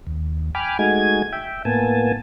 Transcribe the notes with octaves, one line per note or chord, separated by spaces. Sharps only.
D#2
G5 G#5 B5 D6 F6
G#3 A3 D#4 F#4 G#5 G#6
E5 G5
A2 A#3 B3 G#5 A5